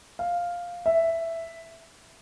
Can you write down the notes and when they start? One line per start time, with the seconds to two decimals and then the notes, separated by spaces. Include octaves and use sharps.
0.19 F5
0.86 E5